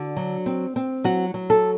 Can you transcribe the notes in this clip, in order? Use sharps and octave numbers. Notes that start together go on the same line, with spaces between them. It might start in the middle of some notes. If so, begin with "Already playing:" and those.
Already playing: D3 F#4
F#3
C4
C4
F#3 F#4
F#3
A4